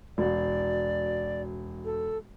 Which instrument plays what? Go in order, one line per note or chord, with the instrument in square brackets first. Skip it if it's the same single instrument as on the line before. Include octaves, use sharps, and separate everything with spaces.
[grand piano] E1 F#4 [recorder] D5
[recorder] A4